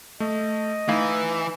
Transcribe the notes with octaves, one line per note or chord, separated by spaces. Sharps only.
A3 D#5
E3 A3 D#4 F5 G#6